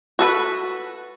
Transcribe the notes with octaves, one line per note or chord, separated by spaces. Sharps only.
F#4 A4 B4